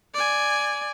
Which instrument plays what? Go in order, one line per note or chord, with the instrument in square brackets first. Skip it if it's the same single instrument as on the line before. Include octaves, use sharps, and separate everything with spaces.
[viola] D5 G#5